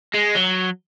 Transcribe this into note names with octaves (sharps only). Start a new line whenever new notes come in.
G#3
F#3